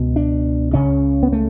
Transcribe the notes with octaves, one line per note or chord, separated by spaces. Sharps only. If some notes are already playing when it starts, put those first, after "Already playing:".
Already playing: C#2 B2
D4
C#2 C#3 C#4
B3
A3